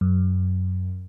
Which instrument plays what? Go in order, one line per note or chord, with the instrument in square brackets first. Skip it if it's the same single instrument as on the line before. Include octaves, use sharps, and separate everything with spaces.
[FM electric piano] F#2